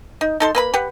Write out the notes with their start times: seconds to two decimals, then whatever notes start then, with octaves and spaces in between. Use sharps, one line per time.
0.21 D#4
0.40 D#4 A4 C6
0.55 A#3 B4 B5
0.74 G4 B4 F#5